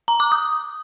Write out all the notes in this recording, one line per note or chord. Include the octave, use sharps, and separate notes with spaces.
A#5
D6
D#6